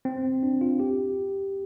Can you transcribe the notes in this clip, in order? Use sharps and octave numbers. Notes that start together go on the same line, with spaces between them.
C4
D4
F4
G4